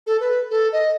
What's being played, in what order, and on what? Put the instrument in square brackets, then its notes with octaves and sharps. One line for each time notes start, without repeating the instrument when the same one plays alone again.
[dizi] A4
B4
A4
D#5